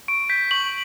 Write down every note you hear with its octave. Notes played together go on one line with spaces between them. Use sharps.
C#6 D7
G6 B6
C#6 F#7